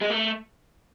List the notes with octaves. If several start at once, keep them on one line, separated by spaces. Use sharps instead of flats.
G#3
A3